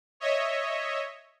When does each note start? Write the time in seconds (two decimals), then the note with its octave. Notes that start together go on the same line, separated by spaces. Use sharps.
0.20 C#5 D#5 E5